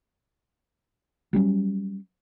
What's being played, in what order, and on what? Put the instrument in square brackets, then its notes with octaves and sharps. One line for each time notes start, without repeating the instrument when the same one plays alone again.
[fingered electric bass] F#3 G3 B3 C#4